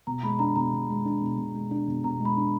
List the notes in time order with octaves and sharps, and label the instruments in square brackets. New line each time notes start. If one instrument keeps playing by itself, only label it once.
[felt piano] B2 [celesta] A#5
[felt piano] G#3 [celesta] B5
[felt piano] D4 [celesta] A#5
[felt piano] B2 [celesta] A#5
[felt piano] B2
G#3
D4
B2
B2
G#3
D4
B2
[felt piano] B2 [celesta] A#5
[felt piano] G#3
[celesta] B5
[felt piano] D4